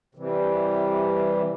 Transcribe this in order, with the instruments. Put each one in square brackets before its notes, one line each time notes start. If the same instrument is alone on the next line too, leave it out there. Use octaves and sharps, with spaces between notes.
[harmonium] C3 E3 G3